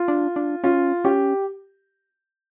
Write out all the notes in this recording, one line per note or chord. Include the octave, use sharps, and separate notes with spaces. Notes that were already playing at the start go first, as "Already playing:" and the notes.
Already playing: F4
D4
D4
C#4 F4
C#4 G4